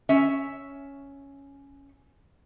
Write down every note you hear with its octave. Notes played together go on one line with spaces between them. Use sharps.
C#4 E5